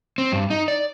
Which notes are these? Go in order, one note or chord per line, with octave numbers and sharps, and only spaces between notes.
C4
G2
D#4
D5